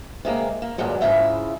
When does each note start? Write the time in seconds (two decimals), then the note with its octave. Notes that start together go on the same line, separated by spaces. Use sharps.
0.25 C3 G#3 A#3
0.62 A#3
0.78 G2 A#2 D3 F#3 G#3
1.01 G#2 C#3 G#3 E4 F4 E5